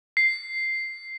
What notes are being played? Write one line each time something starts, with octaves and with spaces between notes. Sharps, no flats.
C7